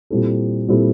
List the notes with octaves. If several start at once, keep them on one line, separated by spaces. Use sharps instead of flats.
A#2 G3 C4 E4 A4
A#2 G3 C4 E4 A4